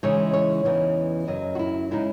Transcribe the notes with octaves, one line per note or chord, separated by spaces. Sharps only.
C#3 E3 G#3 D#4 C#5
C#5
E2 C#3 E3 B3 D#4
F#2 C#3 F#3 D#5
F#4
E4
C#3 G#3 D#4 E4